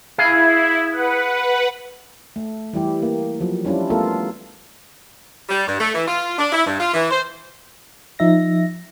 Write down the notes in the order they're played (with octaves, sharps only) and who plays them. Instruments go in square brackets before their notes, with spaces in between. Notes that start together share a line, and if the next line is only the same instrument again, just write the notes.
[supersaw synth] E4 [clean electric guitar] G#4 F5
[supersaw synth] B4 F#5
[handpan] A3
E3 G3 E4 G4
A#3
F3 F#3
G3 C#4 D4 E4 F4
A3 B3 F4 A4 A#4
[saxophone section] G3
G2
A3
E3
F4
D4
E4
G2
F4
E3
C5
[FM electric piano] F3 D#4 E5 A#6